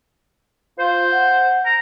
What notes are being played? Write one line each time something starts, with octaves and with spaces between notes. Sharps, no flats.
F4 C5
F#5
A#5